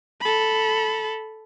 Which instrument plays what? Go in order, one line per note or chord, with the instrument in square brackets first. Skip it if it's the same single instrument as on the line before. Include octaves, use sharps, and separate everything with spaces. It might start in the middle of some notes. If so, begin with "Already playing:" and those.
[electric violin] A4 B5